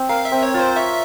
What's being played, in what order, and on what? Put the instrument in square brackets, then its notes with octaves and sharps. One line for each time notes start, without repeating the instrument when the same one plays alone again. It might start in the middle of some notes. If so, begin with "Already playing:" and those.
Already playing: [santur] C4
[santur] A#4 [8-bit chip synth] F5
[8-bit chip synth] E5
[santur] C4
[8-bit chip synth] C#5
[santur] F4
[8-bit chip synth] C5
[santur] C#5 [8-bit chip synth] E5